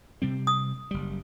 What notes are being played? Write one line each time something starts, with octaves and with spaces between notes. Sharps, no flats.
C3 G3 C4
D#6
F#1 G3